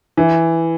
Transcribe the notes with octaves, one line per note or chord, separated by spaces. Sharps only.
E3